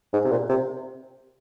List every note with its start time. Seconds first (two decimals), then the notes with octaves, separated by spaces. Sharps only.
0.13 G#2
0.25 C3
0.31 A#2
0.49 C3